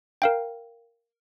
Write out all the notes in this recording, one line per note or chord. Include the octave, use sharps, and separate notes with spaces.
A#4 F5 G5